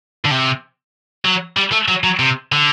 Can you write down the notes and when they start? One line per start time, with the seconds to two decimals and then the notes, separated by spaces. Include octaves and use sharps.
0.25 D3
0.31 C3
1.25 F#3
1.57 G3
1.72 A3
1.88 F#3
2.04 F#3
2.19 C3
2.52 D3